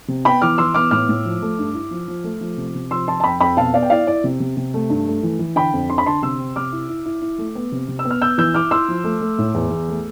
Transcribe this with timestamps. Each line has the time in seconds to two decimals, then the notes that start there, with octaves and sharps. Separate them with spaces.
0.08 C3
0.25 B3 G5 B5
0.42 E3 D6 F6
0.58 E3 C6 E6
0.74 B3 D6 F6
0.91 A2 D6 F6
1.09 A2
1.25 F3
1.42 A3
1.59 G2
1.74 E4
1.91 F3
2.08 F3
2.24 A3
2.41 F3
2.57 C3
2.75 C3
2.91 F3 C6 E6
3.07 F3 A5 C6
3.20 A5
3.24 F2 G5 B5
3.41 F2 G5 B5
3.57 B2 F5 A5
3.74 B3 D5 F5
3.82 G5
3.90 E4 D5 F5
4.07 E4 D5
4.24 C3
4.40 C3
4.57 C3
4.74 A3
4.90 G2
5.07 A3
5.23 E3
5.39 E3
5.56 D3 G5 B5
5.73 F2
5.90 D4 C6
5.98 B5
6.06 D3 A5 C6
6.23 C3 C6 E6
6.39 C4
6.56 C3 D6 F6
6.72 E4
6.89 E4
7.06 E4
7.22 E4
7.38 A3
7.55 B3
7.72 C3
7.88 C3
7.99 E6
8.05 B3
8.10 F6
8.22 B3 E6 G6
8.38 E3 E6 G6
8.54 E4 D6 F6
8.71 E4 C6 E6
8.88 F3
9.04 A3
9.21 A3
9.39 A2
9.54 E2
9.71 E2
9.88 A3